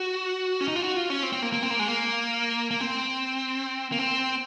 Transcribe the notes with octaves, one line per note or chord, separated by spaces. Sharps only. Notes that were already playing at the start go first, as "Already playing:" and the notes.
Already playing: F#4
C#4
D#4
F4
F#4
F4
C#4
C4
C4
A#3
A#3
C4
A#3
G#3
A#3
A#3
C4
A#3
C4